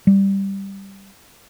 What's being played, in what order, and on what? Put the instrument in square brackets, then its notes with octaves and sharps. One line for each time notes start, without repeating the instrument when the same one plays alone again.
[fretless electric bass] G3